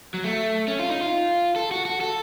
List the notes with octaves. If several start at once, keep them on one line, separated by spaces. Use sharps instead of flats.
F#3
A3
C#4
F4
D#4
F4
A4
F#4
F#4
A4